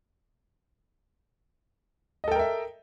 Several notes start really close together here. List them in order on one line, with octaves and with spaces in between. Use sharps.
D#5 A4 G5 A#4 E5